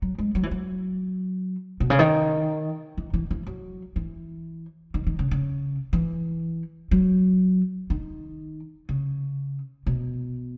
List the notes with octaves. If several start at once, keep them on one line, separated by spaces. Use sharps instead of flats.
F#3
G#3
F#3
E3
F#3
B2
C#3
D#3
E3
E3
E3
F#3
E3
D#3
D#3
C#3
C#3
E3
F#3
D#3
C#3
B2